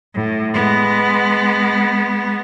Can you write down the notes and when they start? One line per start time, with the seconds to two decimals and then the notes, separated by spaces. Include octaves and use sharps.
0.15 A2
0.54 G#3 B3